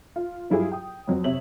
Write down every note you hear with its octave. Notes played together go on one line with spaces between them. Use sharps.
F4
G2 F#3 E4 F4 G4 G#4
G5 D#6
F2 F#3 C4
C3 C#5 E5 F#7